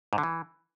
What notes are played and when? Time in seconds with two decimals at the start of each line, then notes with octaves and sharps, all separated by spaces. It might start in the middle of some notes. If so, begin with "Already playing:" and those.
0.13 G#2
0.18 D3
0.23 E3